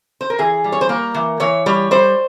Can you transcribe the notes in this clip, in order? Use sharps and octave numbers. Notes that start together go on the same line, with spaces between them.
C5
A#4
E3 G#4
G3
C#5
C5
A#3 A#4
E3
E3 C#5
G3 C#5
G3 C5